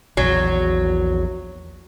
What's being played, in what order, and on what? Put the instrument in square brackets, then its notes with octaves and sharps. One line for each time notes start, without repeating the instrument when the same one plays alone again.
[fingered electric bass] A#1 E2 [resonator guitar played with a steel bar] F#3